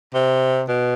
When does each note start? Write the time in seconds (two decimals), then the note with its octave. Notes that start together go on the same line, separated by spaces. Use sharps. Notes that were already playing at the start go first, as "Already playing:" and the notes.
0.15 C3
0.69 B2